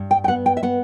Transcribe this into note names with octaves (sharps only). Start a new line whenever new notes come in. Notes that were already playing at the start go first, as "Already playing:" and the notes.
Already playing: G2
G5
G5
B3 F#5
G5
E5
B3 F#5